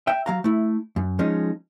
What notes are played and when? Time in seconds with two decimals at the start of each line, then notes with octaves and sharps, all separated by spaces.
0.07 E5 G5
0.26 F#3 F5 A#5
0.44 A3 E4
0.96 F#2
1.19 F3 G#3 C#4 D#4